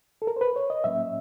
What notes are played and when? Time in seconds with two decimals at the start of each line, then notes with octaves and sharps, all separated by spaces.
0.22 A4
0.27 A#4
0.36 C5
0.41 B4
0.56 C#5
0.70 D#5
0.84 A2 F#3 A#3 C#4 E5